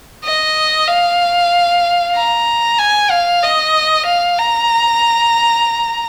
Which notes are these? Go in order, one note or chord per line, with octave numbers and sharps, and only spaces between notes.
D#5
F5
A#5
G#5
F5
D#5
F5
A#5